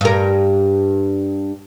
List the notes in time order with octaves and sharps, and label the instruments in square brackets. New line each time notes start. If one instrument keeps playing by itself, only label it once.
[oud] G2 A#4